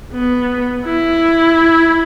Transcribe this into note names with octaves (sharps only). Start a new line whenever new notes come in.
B3
E4